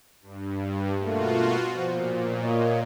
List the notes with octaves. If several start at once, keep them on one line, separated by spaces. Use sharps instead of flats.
G2
B2 A3 A#3 F4 F#4
A#2 F3
A#3 C#5 D#5